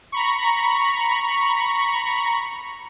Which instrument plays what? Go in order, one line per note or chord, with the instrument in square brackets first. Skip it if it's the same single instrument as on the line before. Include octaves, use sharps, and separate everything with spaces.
[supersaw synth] A#5 B5 C#6